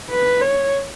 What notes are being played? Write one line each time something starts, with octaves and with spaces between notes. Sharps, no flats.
B4
C#5